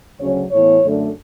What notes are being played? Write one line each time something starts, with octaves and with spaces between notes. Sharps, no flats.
D2 C#3 F#3 C#4 C#5
A2 E3 B3 C#5
F#2 D3 A3 D4